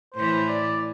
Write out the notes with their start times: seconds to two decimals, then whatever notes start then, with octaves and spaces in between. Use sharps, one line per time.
0.14 A2 E3 C5
0.49 D5